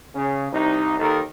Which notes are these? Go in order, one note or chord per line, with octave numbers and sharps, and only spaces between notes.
C#3 C#4
C2 D#4
D#2 D#3 D#4 A4 A#4